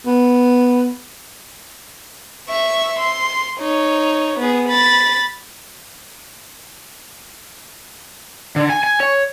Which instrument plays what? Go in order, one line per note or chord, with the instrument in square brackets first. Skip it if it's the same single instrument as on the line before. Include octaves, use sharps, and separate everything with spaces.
[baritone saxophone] B3
[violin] E5 C#6
C6
D#4 C#5
B3 G#4
B5 A6
[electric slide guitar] D3
G#5
G#5
C#5